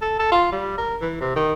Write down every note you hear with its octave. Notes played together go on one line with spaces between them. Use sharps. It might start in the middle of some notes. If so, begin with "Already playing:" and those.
A4
A4
F4
G3
A#4
E3
C3
D#3